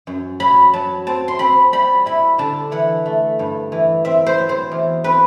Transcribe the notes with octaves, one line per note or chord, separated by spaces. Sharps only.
F#2
F#3 B5
F#3 A5
C4 A5
C6
C4 B5
G3 B5
E4 B5
D3 A5
E3 F#5
A3
G2
E3
C4 E5
C5
F#3
C5
E2
C4 B4